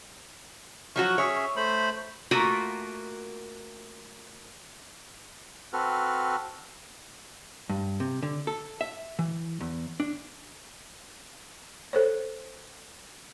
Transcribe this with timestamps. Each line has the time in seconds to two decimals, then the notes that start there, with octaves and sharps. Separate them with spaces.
0.96 F3 F#3 F#4 C#6
1.18 C#4 G#4 C#5 E5
1.56 A3 C5 B5
2.31 A3 A#3 F4 F#4 A#4
5.73 C4 F#4 A4 B4 F6
7.70 G2
8.00 C3
8.23 D3
8.47 A4
8.81 E5
9.19 E3
9.61 E2
10.00 D4
11.93 A4 C5 C#5